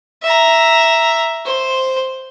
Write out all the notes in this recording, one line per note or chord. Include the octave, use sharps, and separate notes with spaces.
E5 A#5
C5